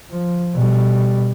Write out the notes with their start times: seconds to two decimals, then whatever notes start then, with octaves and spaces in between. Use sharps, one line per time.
0.11 F3
0.55 B2 G3